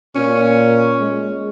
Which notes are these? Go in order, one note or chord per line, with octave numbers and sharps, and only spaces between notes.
A#2 C#4
G#3